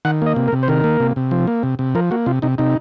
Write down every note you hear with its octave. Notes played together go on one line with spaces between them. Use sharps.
D#3 F#5
A#3 D#5
C3
A#4
C3
C5
D#3 A#4
A#3
C3
C3
F3
A#3
C3
C3
F3 A#4
A#3 F#4
C3 F4
C3 D#4
C3 D#4